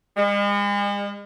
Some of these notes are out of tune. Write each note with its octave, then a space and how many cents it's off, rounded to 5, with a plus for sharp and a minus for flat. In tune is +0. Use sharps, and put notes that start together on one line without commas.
G#3 -40